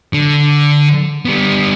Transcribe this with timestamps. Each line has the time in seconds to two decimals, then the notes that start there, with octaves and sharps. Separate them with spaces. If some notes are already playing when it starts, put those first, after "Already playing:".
0.13 D3
1.25 G3 B3